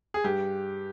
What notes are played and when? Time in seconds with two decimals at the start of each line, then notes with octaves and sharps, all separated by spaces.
0.14 G#4
0.24 G2 G4